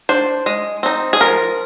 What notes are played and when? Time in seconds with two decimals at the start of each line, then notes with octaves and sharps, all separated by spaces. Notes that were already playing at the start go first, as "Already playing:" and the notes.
0.09 D4 C5
0.46 G#3
0.83 C4 D#4
1.13 G#4
1.20 F3 A#4